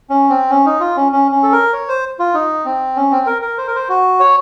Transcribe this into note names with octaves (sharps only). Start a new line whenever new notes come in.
C#4
C4
C#4
D#4
F4
C#4
C#4
C#4
A4
A#4
C#5
C5
F4
D#4
C4
C#4
C4
A#4
A#4
C5
A#4
C5
F#4
C#5